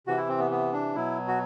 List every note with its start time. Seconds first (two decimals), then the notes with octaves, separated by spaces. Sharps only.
0.07 C3 E3 F#4
0.17 E4
0.29 C4
0.39 B3
0.51 B3
0.73 D4
0.95 B2 F#3 E4
1.28 F#4